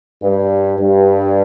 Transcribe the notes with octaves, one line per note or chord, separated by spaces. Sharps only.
G2
G2